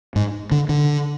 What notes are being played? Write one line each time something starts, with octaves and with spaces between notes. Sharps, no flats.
G#2
D3
D3